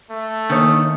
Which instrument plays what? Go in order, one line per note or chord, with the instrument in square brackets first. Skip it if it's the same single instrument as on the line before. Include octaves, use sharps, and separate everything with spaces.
[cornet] A3
[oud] D#3 C#5 [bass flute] A#3 [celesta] D4 D#6